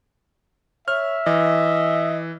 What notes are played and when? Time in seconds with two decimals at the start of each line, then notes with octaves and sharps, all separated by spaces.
0.88 C#5 E5 F6
1.26 E3 D#5